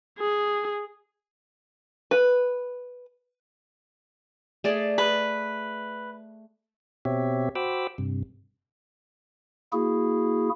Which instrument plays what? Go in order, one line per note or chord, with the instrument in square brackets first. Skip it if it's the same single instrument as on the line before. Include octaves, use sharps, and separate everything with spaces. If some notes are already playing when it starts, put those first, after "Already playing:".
[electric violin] G#4
[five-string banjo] B4
[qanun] A3 G#4 D5
[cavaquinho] B4
[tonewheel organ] B2 C4 G4 C#5 E5
F#4 C5 G5 B5 D6 E6
G2 C3
[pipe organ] A#3 E4 F#4 G#4